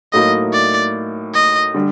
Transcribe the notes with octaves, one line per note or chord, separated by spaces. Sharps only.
A2 F#3 A#3 D#4 D#5
D5
D#5
D3 G3